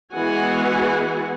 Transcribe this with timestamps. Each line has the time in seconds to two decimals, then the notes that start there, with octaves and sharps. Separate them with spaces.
0.13 E3 G#3 B3 F#4 F#5 G#5